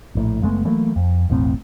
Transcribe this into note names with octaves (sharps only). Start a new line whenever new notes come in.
A#1 A2
F#1 G#3 A3 B3
E3 F#3 A3 A#3
F2
E1 A1 A2 C4